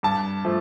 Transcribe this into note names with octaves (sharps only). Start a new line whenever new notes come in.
G2 A5
F3 A3